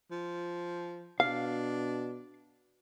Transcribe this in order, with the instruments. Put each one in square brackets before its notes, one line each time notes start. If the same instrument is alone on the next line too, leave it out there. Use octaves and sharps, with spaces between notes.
[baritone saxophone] F3
[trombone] B2 [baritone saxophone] D4 [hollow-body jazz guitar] F5